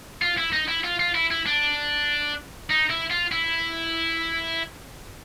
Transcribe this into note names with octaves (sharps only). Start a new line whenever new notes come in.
F4
E4
D#4
E4
F4
F4
E4
E4
D4
D#4
E4
F4
E4